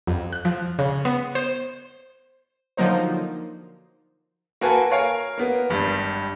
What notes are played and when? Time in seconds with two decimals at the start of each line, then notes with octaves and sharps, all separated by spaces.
0.07 F2
0.33 F#6
0.45 F3
0.79 C#3
1.05 B3
1.35 C5
2.77 D3 F3 F#3 A#3 D#4 C5
4.61 A#3 F#4 A4 B4 G#5 A5
4.91 A#4 C#5 F5 G#5
5.38 A#3 B3
5.70 G#1 G2 G3